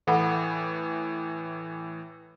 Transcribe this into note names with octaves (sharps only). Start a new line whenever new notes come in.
A2 E3 A4 F#5 B5